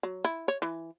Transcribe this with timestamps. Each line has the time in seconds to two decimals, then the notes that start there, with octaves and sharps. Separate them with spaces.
0.03 F#3
0.25 E4
0.48 C#5
0.62 E3